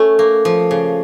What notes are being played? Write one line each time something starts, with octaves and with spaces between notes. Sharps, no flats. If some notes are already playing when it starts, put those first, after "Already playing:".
Already playing: A3 C#4
A#3
F3
C#3